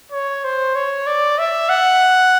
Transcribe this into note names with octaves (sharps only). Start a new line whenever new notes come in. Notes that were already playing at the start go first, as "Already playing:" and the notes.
C#5
C5
C#5
D5
E5
F#5